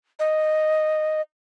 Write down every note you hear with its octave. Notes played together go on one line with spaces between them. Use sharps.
D#5